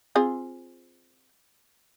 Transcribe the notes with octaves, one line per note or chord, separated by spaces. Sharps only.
C4 F4 G#4